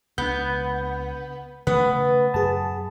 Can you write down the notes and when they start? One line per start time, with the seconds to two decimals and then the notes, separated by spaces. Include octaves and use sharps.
0.18 C#2 B3 D4 G6
1.67 C#3 A3 B3 B4
2.34 F#2 G#4 A5